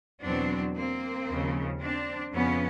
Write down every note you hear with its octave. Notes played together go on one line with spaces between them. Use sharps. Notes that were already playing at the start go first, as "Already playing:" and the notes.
E2 B2 F#3 C4 D4
A#3 C4
D#2 C#3 F3
C4 D4
F2 C#3 F3 B3 C#4